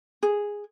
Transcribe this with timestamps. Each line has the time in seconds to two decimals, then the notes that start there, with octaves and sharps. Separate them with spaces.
0.23 G#4